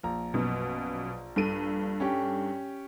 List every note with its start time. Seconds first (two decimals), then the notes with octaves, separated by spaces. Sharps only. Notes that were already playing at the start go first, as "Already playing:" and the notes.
0.03 A#1 A#5
0.34 F#2 B2
1.36 G2 A4 D#7
2.00 C#4 G4